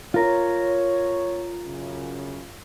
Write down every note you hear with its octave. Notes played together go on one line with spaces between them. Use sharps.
F4 A#4 C#5
F#2 C#3